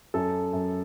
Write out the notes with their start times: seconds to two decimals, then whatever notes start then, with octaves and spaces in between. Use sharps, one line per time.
0.14 F#2 A4
0.53 F#2